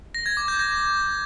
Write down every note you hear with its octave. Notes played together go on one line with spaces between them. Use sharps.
A#6
G#6
D6
G6
A#6